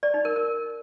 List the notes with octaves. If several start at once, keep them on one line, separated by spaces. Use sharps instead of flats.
D5
D#4
A#4
A#4